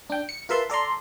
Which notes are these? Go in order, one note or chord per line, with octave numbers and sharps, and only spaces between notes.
D4 G5
C#7
F4 A#4 B4 E5 A5 C6
A4 D5 A#5 C6